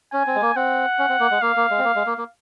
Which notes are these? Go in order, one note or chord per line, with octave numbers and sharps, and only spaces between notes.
C#4 G#5
C4
G#3
A#3
C4 F#5
C#4
C4
A#3
G#3
A#3 F5
A#3
G#3
C4
A#3
G#3
A#3
A#3